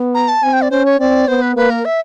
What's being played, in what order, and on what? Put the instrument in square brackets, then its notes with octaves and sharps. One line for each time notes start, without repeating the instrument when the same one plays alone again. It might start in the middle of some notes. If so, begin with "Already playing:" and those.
Already playing: [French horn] B3
[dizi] A#5
A5
[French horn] C4 [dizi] G#5
[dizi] G5
D5
[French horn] C#4 [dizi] C5
[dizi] C#5
[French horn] C4 [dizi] D5
[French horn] B3 [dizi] C5
[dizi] B4
[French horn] A#3 [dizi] B4
[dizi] A#4
E5